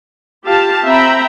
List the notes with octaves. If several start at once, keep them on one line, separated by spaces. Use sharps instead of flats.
F4 G4 F5 A5
C4 E5 G5 A#5 B5